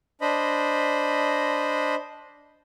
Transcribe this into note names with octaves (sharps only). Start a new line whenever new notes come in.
D4 C5 D#5 B5